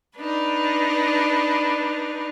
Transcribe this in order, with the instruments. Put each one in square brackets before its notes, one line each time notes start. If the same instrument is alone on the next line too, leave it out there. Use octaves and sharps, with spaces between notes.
[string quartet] D4 D#4 B4